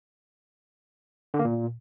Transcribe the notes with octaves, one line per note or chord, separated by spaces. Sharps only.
D3
A#3
A#2